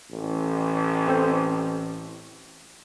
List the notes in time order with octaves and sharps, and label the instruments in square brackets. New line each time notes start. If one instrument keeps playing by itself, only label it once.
[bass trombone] A1
[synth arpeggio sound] C4 A4 C5